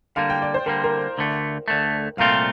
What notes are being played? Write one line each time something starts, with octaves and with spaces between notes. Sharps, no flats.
D3 G3 A#3 F5
G5
D5
C5
D3 G3 A#3 A#4
A#4
D2 D3 A3
D2 D3 A3
C2 A#2 A3 C4 F4 F5